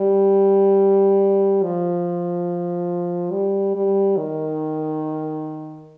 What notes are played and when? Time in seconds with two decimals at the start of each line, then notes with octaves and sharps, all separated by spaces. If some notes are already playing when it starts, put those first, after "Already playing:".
Already playing: G3
1.63 F3
3.32 G3
3.75 G3
4.17 D#3